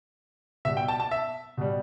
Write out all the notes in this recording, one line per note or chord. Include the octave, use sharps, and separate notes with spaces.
B2 G3 E5
G5
A5
A5
E5
B2 G3